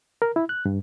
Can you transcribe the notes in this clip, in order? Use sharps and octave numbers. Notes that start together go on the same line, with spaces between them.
A#4
E4
F#6
G2